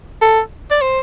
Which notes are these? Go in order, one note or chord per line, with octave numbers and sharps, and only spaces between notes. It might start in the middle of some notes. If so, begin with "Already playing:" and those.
A4
D5
C5